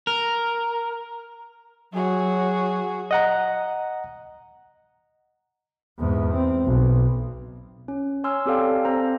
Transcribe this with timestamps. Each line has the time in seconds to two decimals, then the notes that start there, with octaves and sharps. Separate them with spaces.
0.07 A#4
1.93 F#3 F#4 G#4
3.11 D#5 F#5 A#5
5.99 E2 G#2
6.33 C4
6.66 B1
7.88 C#4
8.24 C#5 G#5 C6 E6 F6
8.46 C4 G4 A4 D5 F5 G5
8.85 C4 A4 C5 A#5